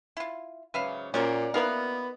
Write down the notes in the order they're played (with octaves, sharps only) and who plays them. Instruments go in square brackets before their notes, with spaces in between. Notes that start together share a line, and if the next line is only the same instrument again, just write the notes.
[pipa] E4 F4
[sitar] G#2 C#3 F#3 [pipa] B4 E5 F5
[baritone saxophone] A#2 [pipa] F#3 A#4 C5 [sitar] A#3 F#4 D5 [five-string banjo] C#4
[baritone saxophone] B3 [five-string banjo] D#4 A#4 B4 [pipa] E4 F5